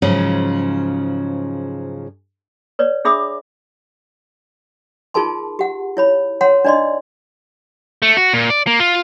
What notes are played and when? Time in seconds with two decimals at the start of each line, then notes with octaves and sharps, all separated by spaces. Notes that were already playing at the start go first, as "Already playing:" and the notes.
0.02 G#2 C#3 F3 F#3 C#4
2.79 B4 C#5 D5
3.05 D4 G#4 E5 B5 D6 D#6
5.14 D#4 F4 G#4 A#4 A5 C6
5.59 G4 F#5
5.97 E4 C#5 B5
6.41 C#5 F#5 A#5 C6
6.65 D4 D#4 D5 D#5 C6
8.02 A3
8.17 F#4
8.34 A#2
8.50 D5
8.67 A#3
8.80 F4